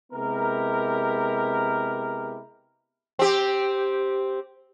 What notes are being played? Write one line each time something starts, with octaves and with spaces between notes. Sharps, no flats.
C3 G#3 B3 E4 G4 A#4
C4 G4